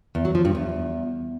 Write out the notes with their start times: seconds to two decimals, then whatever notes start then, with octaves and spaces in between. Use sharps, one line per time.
0.15 E2
0.25 F#3
0.35 F3
0.45 G2
0.55 E2